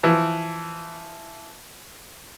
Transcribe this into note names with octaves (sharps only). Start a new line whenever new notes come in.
E3 F3